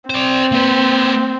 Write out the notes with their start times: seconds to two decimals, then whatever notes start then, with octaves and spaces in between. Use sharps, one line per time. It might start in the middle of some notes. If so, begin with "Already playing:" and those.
0.10 C4 C5 D5
0.52 A#3 B4